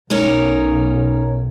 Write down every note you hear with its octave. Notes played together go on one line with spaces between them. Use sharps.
B1 C#4 D#4 A#4